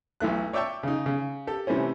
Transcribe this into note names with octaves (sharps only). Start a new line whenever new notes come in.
B1 E3 A3 F#6
C#5 D5 E5 G5 A5 C#6
C#3 D#4
C#3
G4 A4
C3 E3 G3 A3 C4 C#4